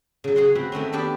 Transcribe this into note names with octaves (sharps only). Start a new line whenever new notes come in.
C#3 F#3
G#4 C#5 F#5 C6
C4 F#4 B4
D#3 A3 C4 C#4
B3 D4 G4 D5 E5 B5